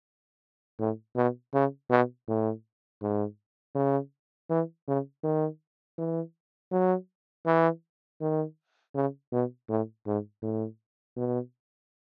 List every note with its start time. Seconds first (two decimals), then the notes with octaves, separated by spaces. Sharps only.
0.79 A2
1.16 B2
1.54 C#3
1.90 B2
2.28 A2
3.02 G#2
3.75 C#3
4.50 E3
4.87 C#3
5.24 D#3
5.98 E3
6.72 F#3
7.46 E3
8.21 D#3
8.95 C#3
9.32 B2
9.69 A2
10.06 G#2
10.42 A2
11.17 B2